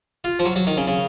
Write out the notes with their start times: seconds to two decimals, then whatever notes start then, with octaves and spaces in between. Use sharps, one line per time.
0.24 F4
0.39 F3
0.45 F#3
0.56 F#3
0.67 D#3
0.77 C#3
0.88 C#3